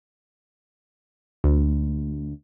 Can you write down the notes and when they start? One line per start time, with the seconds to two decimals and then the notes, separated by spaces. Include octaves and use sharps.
1.44 D2